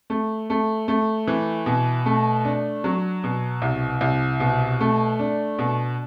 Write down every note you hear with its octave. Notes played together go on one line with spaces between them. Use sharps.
A3
A3
A3
E3
B2
A3
D4
F#3
B2
C2
C2
B2
A3
D4
B2